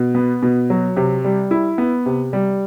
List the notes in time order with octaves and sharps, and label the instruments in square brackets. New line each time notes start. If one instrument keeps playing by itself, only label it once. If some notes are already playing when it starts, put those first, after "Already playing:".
Already playing: [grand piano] B2
B3
B2
F#3
C3
G3
E4
B3
C3
G3